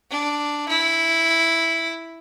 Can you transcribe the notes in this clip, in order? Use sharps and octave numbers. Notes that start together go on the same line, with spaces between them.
D4
E4